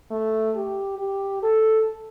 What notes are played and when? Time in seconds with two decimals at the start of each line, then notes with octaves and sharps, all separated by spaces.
0.11 A3
0.56 G4
0.99 G4
1.43 A4